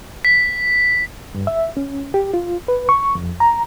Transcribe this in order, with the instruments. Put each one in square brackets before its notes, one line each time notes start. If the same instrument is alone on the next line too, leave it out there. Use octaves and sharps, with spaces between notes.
[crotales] B6
[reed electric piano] G2
E5
C#4
G4
F4
B4
C#6
F2
A#5